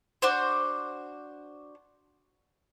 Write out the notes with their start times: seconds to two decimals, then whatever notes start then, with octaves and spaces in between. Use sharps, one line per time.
0.22 D4 F#4 C5